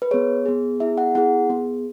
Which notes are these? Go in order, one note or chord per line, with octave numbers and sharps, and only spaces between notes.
B4
B3 G#4 C#5
B3 G#4
B3 E4 G#4 E5
F#5
B3 E4 G#4 F#5
B3 G#4